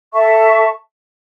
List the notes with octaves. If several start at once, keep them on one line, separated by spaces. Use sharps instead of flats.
A4 E5 A5 C#6